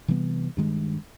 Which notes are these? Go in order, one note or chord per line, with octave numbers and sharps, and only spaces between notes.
C3 E3 G3 B3
G2 D#3 G#3